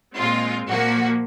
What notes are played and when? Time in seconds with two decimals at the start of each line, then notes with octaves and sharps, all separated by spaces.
0.16 A#2 G#3 C4 F4
0.67 A#2 F3 A#3 F#4